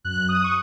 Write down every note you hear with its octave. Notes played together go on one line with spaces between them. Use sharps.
F#2 F#6
D#6
C#6